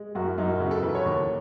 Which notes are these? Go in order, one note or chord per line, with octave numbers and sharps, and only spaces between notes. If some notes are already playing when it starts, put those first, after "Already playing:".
Already playing: G#3
F#2 F#4
E4
F#2 D#4
E4
C#3 F#4
A4
E3 B4
C#5
D#2